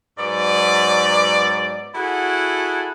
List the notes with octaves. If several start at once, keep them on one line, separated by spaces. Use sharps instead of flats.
G#2 F#3 B3 D5
E4 F#4 G#4 A4 F#5